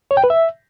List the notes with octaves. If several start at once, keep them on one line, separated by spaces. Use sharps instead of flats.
C#5
G5
B4
E5